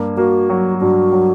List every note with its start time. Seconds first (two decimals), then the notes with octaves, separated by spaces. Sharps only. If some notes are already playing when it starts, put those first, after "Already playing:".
Already playing: G2 A#3
0.17 A#3 F#4
0.50 F#3
0.81 G2 F#4
1.13 F#3